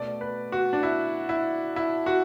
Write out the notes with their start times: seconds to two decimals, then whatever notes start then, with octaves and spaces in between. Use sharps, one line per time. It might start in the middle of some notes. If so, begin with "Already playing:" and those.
Already playing: B2 A3 D5
0.21 B4
0.52 F#4
0.73 D4
0.83 E4
1.29 E4
1.76 E4
2.06 F#4